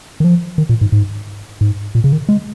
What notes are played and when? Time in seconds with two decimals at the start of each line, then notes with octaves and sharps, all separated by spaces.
0.20 D#3
0.24 F3
0.58 D#3
0.69 A#2
0.81 G#2
0.92 G#2
1.61 G#2
1.95 A#2
2.04 C#3
2.12 D#3
2.29 G#3